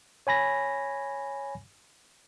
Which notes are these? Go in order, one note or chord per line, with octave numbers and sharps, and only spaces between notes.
C#5 G#5 B5 A#6